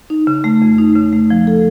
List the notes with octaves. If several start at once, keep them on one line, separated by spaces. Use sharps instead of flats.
D#4
C#3
A3
F2
D#4
C#3
A3
F3
A4